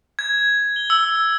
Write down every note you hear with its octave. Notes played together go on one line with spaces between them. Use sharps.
G#6
G7
E6